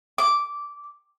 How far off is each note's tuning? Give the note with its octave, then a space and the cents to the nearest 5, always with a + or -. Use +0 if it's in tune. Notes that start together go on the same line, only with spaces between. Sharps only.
D6 -10